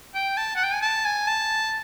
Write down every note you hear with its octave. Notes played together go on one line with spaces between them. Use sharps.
G5
A5
F#5
G5
G#5
A5
G#5
A5